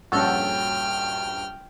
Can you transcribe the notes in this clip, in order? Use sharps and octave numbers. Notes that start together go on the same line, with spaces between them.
A#1 G2 C#4 F#4 A4 G5 F6 G6